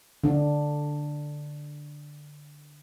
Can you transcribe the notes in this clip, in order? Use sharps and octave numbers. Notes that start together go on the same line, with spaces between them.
D3 D4